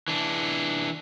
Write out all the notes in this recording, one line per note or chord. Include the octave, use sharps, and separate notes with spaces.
E3 D4